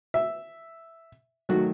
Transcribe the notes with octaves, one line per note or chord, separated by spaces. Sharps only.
E5
D#3 F#3 A3 F#4